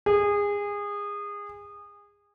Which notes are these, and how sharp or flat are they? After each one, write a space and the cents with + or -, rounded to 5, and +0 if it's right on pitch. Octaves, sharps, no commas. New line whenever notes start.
G#4 -25